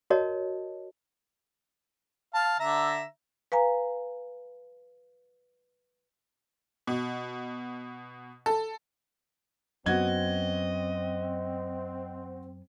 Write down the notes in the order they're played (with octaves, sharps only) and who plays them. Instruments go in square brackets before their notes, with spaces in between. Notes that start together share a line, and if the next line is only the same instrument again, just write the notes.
[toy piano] F#4 A#4 C#5 D#5 A5
[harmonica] F5 A5
D3 E5 A#5
[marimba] B4 F5 G#5 A#5
[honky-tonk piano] B2
A4
[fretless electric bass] F#2 B3 [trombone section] C4 [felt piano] F#4 G#6 [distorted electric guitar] D#5